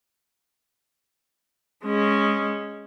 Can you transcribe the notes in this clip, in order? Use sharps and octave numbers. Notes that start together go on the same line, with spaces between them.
G#3 C#4